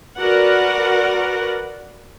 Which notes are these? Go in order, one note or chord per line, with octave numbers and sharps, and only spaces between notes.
F#4 A#4 B4 D5 F#5